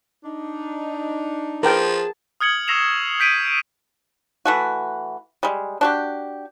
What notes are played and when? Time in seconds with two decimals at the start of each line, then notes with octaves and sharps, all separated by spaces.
0.24 D4 D#4
1.63 F3 G#4 A#4 B4 G5 A5
2.41 D#6 F6 G#6 C#7 F#7
2.68 C#6 E6 A#6 C7 E7 F7
3.20 G6 B6 D7 D#7
4.45 E3 A3 F#4
5.43 G3 G#3
5.81 D4 F#4 G4